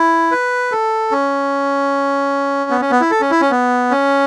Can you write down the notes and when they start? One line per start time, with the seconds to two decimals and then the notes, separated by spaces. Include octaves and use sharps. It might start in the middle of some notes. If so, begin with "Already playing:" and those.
Already playing: E4
0.31 B4
0.72 A4
1.11 C#4
2.70 B3
2.81 C#4
2.91 B3
3.01 E4
3.11 A4
3.21 C#4
3.31 E4
3.41 C#4
3.51 B3
3.91 C#4